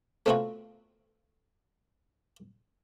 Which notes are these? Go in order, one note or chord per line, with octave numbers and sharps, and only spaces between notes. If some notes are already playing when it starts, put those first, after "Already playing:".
A3 B3 C4 D#4 F4 F#4